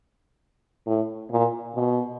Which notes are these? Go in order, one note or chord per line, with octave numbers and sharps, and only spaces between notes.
A2
A#2
B2